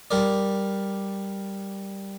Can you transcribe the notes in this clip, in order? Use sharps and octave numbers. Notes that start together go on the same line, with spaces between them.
G3 A#4 D5